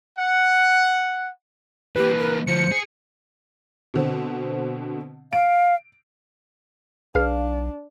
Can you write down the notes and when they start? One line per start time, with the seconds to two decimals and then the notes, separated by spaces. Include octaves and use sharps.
0.19 F#5
1.96 E3 A#3 G4 B4
2.19 A#4
2.47 D2 F3 C5 C#7
2.72 G#4
3.94 B2 D3 C4
5.33 F5 D7
7.15 B1 D4 G#4 B4 F5 C7